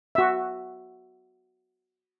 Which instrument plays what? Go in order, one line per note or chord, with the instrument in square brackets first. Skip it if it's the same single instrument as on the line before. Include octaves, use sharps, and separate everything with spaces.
[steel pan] F#4 E5